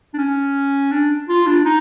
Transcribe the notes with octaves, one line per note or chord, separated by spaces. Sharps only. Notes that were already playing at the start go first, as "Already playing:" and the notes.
D4
C#4
D4
F4
D4
D#4